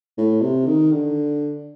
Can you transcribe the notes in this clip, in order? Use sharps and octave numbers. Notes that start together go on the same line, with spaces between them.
A2
C3
D#3
D3